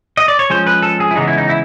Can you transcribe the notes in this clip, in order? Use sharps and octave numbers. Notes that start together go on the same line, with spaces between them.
D#5
D5
C#5
F3 G#3 C#4 C5
B4
A4
G#4
E4
C#3 E3 G#3 B3 D#4
E4
D#4
E4